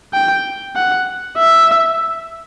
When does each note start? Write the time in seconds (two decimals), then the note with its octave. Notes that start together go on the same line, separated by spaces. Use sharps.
0.13 G5
0.76 F#5
1.37 E5